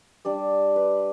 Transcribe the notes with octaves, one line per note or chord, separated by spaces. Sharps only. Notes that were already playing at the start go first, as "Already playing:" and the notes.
G3 D4 D5
B4